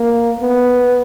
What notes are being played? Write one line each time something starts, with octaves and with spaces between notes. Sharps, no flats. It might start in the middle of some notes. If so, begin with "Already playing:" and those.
Already playing: A#3
B3